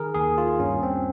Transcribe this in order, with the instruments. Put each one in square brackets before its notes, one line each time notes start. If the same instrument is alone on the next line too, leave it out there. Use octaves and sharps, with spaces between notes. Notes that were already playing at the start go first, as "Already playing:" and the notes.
Already playing: [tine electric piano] D#3 G#4 A#4
D#2 G#4
F4
G2 C#4
C4